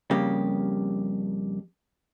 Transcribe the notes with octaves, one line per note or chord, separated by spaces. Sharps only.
F2 C#3 G3 A#3 G4